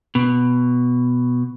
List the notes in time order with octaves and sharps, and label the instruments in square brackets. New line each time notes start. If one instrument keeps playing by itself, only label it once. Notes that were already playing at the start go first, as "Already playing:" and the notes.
[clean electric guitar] B2